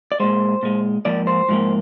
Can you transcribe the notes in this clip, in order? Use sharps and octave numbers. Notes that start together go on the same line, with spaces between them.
D5
A#2 G#3 C5
A#2 G#3
G#2 F3 A#3 D5
C5
G#2 F3 A#3